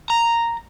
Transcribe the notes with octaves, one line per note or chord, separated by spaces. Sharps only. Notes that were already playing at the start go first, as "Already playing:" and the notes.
A#5